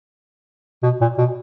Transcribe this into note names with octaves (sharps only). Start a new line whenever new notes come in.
B2
A#2
B2